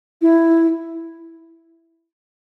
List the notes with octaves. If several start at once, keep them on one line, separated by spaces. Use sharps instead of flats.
E4